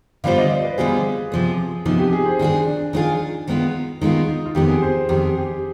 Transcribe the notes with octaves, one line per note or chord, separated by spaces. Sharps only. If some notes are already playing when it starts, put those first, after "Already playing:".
D3 G3 B3 F4 C5 F5
D#5
D5
B4
D3 G3 B3 F4 G#4 C5
C3 F3 B3
C3 F3 B3 D#4
G4
G#4
C5
D#3 B3 D4 F4 G#4
D4
D#3 B3 D#4 F4 G#4
D#3 G#3 B3 F4
D#3 G#3 B3 D#4 F4
D#4
F4
F2 D#3 B3 G4
G#4
C5
F2 D#3 B3 G4
G4